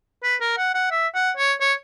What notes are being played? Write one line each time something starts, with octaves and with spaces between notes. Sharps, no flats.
B4
A#4
F#5
F#5
E5
F#5
C#5
C#5